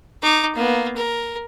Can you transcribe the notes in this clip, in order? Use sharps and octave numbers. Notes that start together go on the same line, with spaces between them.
D#4 D6
A#3 B3
A#4